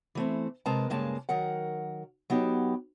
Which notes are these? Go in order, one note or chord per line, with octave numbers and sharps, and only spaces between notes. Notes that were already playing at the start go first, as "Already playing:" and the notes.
E3 A3 C4
C3 G#3 A#4 B4 A5 A#5
G2 C#3 G#3 A#3 A5
D#3 F#3 A#4 F#5
F#3 B3 D#4 G4